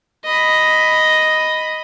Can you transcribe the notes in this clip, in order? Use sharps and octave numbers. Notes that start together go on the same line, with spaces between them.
D#5 B5